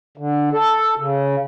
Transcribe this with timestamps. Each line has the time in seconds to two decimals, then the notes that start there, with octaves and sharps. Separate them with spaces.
0.17 D3
0.52 A4
0.99 C#3